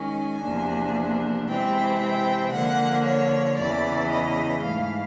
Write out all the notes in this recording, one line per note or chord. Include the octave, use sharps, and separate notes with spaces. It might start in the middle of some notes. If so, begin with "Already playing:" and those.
Already playing: D#3 G#3 C#4 G#5
E2 C3 F3 A#3 D4
C3 E3 G#3 C4 G5
G5
D3 F3 A#3 F#5
C#5
E2 C#3 E3 D5
D#5
G#2 E3 A3 F5